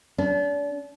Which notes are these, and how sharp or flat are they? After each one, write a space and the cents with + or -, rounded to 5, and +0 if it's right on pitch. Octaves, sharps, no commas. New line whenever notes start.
D4 -35